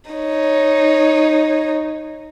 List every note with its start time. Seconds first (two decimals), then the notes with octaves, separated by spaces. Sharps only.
0.11 D#4 C#5